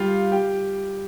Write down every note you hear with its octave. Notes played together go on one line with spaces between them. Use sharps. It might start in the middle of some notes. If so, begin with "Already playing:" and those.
Already playing: G3 F4 G4 F5
G4 G5